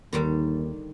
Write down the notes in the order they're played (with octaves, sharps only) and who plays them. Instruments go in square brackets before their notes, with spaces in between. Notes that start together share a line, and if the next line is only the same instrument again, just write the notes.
[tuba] D#2 [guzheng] D3 D#3 G3